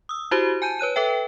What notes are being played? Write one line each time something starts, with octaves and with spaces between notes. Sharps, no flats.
D#6 E6
E4 F#4 G4 C5
G#5 A5 G6 D#7
B4 C#5 F#6 D#7
A4 B4 E5 G5